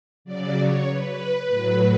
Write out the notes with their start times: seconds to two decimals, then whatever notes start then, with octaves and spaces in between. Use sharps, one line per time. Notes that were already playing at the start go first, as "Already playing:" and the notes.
0.25 C#3 F#3 D5
0.55 C#5
0.86 B4
1.48 A2 F#3